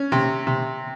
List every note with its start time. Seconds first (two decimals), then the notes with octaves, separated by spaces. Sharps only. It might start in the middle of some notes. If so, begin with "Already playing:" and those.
Already playing: C#4
0.12 C3
0.47 C3